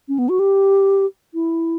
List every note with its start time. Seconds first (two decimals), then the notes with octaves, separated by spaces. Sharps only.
0.08 C#4
0.19 B3
0.29 F#4
0.39 G4
1.34 E4